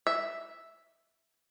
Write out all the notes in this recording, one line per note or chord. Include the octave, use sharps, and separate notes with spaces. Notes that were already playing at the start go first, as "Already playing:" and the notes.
E5